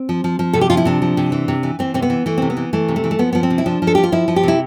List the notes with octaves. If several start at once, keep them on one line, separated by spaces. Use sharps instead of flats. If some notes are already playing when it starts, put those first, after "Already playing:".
Already playing: C4
F3
F3
F3
C3 A4
G4
F3 F4
E4
C3 D4
F3
C3
E3
C3
E3
E3 C4
C3 C4
B3
E3
E3 A3
C3 C4
B3
E3
E3 A3
C3
A3
E3
A3
F3 B3
F3 B3
C4
C3
E4
F3 D4
F3
A4
F3 G4
F4
F3 E4
F3
G4
C3 E4